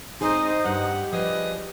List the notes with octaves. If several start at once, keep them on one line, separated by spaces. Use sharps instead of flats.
G#2 C4 D#4 G#4 C5 D#5
G2 G4 F#5
F3 G#4 B4 D5 D#5